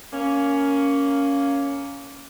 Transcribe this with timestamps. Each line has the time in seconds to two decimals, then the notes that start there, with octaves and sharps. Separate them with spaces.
0.13 A#3 C#4